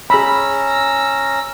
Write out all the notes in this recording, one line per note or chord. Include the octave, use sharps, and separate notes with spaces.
C#4 G#4 A#5 B5 E6